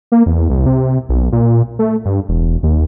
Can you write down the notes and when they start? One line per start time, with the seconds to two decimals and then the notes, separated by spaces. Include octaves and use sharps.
0.12 A#3
0.26 E2
0.50 C2
0.66 C3
1.09 B1
1.32 A#2
1.79 A3
2.05 G2
2.28 E1
2.63 D#2